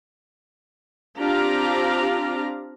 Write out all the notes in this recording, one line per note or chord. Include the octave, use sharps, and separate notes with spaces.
C4 D4 F4 G4 F5 A#5